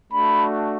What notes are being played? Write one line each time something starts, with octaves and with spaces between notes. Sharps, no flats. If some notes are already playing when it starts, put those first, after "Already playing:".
A3 D4 F#4 B5